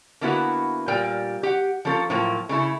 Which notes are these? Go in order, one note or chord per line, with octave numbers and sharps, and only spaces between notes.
D3 A#3 B3 E4 F#4 B4
A#2 G3 A#4 G5
G4 F#5
F3 A#3 C#4 A4
A2 F3 F#3 A#3
C#3 A3 E4 G#4